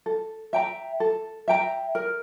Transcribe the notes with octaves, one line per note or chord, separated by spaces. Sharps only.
A4
E5 G5 A#5
A4
E5 G5 A#5
A#4